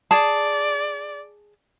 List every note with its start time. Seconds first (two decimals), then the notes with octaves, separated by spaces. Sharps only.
0.11 G#4 D5 A5